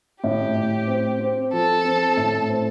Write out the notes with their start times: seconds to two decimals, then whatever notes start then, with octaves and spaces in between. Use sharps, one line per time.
0.23 A2 G4
0.56 A2
0.87 C4
1.20 C4
1.52 F3 A4
1.85 C4
2.17 A2
2.49 C4